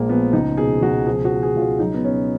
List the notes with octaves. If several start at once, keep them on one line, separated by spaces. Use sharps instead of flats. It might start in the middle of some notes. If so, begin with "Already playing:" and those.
Already playing: A#1 A#2 G#3 A#3
F3 B3
C#2 D#4
B2 G#4
C#2 F#4
F3 G#4
F#4
F3
G#4
C#2 F4
F#4
F#3 D#4
B3
B2 C#4